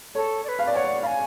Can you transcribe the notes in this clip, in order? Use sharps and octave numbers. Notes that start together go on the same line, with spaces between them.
A4 C#5
D5
B4
F5
D5
G#5
C#5 F#5
D5
F5 G#5 B5